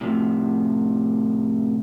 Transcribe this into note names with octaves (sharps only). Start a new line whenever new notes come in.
A2 C3 F3